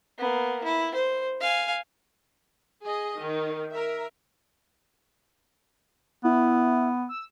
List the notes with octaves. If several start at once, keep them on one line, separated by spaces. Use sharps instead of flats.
A#3 B3
E4
C5
F5 G#5
G#4 D#5
D#3
A#4 E5
B3 E4
E6